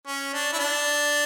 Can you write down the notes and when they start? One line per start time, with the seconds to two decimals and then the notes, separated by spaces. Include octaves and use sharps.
0.07 C#4
0.34 D4
0.53 E4
0.60 D4